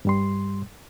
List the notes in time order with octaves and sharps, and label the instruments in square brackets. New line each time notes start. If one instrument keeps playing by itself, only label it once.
[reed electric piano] G2 G3 C6